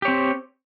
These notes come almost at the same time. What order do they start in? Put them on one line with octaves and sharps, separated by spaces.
G4 C#5 C4